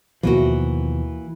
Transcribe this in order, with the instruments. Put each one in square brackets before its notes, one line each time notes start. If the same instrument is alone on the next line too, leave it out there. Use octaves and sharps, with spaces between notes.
[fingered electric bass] D#2 B2 F3 [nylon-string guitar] E3 A#3 F#4